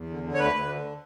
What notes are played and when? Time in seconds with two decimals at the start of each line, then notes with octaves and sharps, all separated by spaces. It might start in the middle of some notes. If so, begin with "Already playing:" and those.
Already playing: E2
0.10 D3
0.24 D3
0.34 C#5
0.39 D2 B4
0.54 D2
0.69 D3